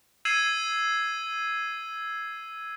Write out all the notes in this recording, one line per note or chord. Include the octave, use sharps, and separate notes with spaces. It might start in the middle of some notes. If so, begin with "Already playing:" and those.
E6 G#6 C7 D#7 E7 F#7